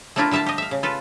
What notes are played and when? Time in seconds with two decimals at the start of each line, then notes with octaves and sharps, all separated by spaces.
0.16 A3 A#3 D4 E4 F4 A#4
0.31 D3 G3 E5 F5 A5
0.46 G4 D#5
0.58 E5 F5
0.71 C#3
0.83 F4 A4 B4